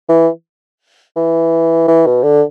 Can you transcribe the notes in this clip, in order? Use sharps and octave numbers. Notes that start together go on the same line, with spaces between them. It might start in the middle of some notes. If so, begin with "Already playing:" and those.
E3
E3
E3
B2
D3